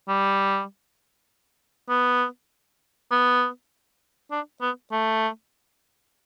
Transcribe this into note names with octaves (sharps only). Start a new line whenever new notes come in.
G3
B3
B3
D4
B3
A3